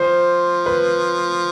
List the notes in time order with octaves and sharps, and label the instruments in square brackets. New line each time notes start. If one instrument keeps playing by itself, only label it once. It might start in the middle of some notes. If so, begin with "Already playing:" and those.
Already playing: [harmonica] F3 [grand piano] C5
[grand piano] B4